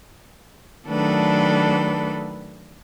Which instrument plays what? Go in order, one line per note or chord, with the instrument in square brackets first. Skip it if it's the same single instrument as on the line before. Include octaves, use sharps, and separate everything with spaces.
[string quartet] D#3 F#3 A3 D4 A4 B4